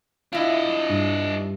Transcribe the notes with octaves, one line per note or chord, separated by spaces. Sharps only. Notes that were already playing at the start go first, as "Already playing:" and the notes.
D4 E4 F4 D#5
G2